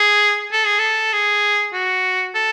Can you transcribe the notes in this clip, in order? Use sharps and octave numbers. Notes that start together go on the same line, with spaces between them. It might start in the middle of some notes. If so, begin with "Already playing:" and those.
Already playing: G#4
A4
G#4
A4
G#4
F#4
A4